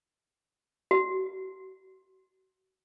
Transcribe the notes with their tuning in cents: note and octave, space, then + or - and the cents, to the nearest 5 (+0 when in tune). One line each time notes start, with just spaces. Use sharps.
F#4 +30